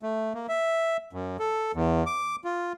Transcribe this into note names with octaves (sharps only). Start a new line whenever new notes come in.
A3
A#3
E5
F#2
A4
E2
D6
F4